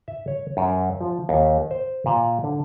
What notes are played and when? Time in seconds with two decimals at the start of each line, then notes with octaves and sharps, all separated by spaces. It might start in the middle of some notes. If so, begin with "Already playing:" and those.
0.08 E5
0.28 C#5
0.57 F#2
1.01 F3
1.29 D#2
1.71 C5
2.06 A#2
2.44 D3